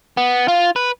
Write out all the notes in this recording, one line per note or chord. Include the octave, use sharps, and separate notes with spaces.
B3
F4
B4